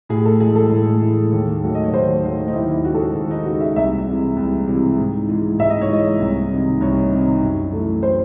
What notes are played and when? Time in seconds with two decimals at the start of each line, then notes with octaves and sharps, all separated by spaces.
0.09 A2 G#4
0.25 A4
0.40 E3 G#3 G#4
0.56 A4
0.71 A2
1.02 E3 G#3
1.32 D#2
1.63 D#3 F#3 A3
1.75 D#5
1.84 C#5
1.93 D#2 C5
2.24 D#3 F#3 A3
2.48 D#4
2.53 D#2 E4
2.70 E4
2.84 C#3 G#3 F#4
2.94 A4
3.00 G#4
3.15 D#2 G#4
3.31 D#4
3.45 C#3 G#3 F#4
3.60 E5
3.76 C2 E5
4.07 C3 E3 G#3
4.37 C2
4.67 C3 E3 G#3
4.98 G#2
5.28 E3 G#3
5.59 G#2 E5
5.70 D#5
5.81 C#5
5.90 E3 G#3 D#5
6.20 C2
6.51 C3 D#3
6.81 C2 C#5
7.12 C3 D#3
7.43 F#2
7.73 E3 A3
8.03 C5